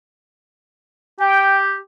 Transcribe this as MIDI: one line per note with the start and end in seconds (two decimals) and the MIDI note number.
1.20 1.77 67
1.20 1.60 79